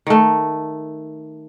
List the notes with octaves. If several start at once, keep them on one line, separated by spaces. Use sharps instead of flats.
D#3 A3